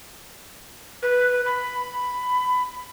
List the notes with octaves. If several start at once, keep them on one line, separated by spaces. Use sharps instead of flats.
B4
B5